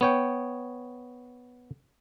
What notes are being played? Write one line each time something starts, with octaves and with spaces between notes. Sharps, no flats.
B3 C#5 G5